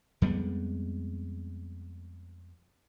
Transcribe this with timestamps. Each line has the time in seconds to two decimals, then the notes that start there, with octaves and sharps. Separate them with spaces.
0.22 F2 G3 G#3 B3